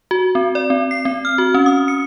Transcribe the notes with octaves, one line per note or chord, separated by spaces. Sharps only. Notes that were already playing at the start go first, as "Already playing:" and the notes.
F#4
C4
D5
C4
C7
C4
F6
F#4
C#4
D#6
C#7